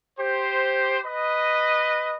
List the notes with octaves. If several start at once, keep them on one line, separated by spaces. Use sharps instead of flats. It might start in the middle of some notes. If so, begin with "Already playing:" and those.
G4 C5
B4 D#5